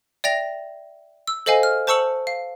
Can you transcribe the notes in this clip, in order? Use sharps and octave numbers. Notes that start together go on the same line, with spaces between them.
D5 E5 G5 A#6 F7
E6
A4 C5 D#5 F5 G#5
F6
C5 A5 C#6 E6 C#7 F#7
F5